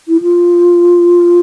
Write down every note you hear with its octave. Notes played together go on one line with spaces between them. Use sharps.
E4
F4